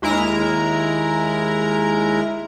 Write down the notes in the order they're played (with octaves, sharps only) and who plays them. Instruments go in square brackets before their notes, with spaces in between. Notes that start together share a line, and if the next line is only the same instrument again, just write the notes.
[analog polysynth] D#2 G#3 E4 A#4 A#5